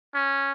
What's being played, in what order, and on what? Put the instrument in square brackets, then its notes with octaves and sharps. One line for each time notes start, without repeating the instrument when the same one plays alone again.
[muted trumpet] C#4